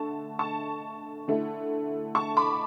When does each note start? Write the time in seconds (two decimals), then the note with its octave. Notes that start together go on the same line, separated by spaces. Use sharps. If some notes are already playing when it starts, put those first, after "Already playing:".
Already playing: D3 A3 A5 C#6
0.39 A5 C#6
1.28 D3 A3 E4
2.15 A5 C#6
2.37 B5 D6